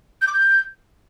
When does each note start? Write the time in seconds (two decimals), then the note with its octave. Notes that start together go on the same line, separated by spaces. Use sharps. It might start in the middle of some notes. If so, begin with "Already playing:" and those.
0.21 G6
0.27 D6
0.33 G6